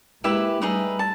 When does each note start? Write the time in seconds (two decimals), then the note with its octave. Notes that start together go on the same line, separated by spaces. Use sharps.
0.24 G#3 A#3 E4 G4 B4 E5
0.62 G3 A3 D#4 G#4 B4 E5
0.99 A5